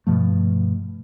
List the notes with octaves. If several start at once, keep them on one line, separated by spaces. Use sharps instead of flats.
G2 B2 F3 A3